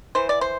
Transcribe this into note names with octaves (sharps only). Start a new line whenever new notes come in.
E3 C5
D5
C5